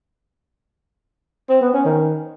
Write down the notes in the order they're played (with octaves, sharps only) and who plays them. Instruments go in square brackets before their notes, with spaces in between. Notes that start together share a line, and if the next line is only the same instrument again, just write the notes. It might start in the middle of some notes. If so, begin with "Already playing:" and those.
[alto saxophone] C4
B3
C#4
D#3